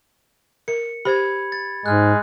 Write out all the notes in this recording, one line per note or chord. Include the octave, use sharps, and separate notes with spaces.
A#4 C#7
G4 C5 B5 G#6
A6
G#2 G#3 F6 F#6